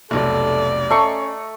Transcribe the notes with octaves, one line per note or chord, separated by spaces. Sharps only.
F1 B1 C3 A4 D5
A3 C#4 D#5 A#5 C#6 C7